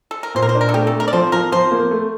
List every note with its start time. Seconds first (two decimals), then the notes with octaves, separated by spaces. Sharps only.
0.11 A4
0.23 A#4
0.35 A#2 C5
0.42 A#4
0.49 C5
0.55 D4
0.61 A#4
0.69 A4
0.74 A3 G4
0.87 A4
0.93 A3
1.00 A#4
1.08 D5
1.13 F3 C5
1.32 F3 A#4
1.52 F3 C5
1.71 A#3
1.91 A3